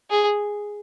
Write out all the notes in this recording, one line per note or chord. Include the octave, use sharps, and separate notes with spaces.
G#4